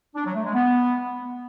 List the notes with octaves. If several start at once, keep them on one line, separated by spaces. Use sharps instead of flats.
D4
F#3
A3
G#3
B3